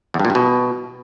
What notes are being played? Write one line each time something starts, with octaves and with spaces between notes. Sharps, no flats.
E2
G2
A#2
G2
B2